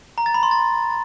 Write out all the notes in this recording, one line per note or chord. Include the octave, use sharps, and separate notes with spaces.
A#5
A6
B5
C6
A6